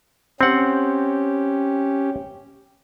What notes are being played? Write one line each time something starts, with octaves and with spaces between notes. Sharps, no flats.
C4 C#4 G4 F#5